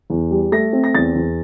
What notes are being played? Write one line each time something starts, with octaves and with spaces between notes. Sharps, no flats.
E2
G3
A3 A#6
C4
A#6
E2 A6
E2